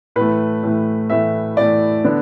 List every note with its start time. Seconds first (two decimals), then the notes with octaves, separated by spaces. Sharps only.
0.16 A2 E3 A3 B4
0.63 A2 E3 A3
1.10 A2 E3 A3 E5
1.57 A2 E3 A3 D5
2.04 D3 B3 D4